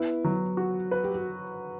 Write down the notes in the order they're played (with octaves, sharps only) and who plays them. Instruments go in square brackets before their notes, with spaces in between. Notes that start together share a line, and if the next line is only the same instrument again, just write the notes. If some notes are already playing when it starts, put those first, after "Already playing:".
Already playing: [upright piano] B3 [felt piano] E4
[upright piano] F#3
F#4
B4
[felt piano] G4
F#4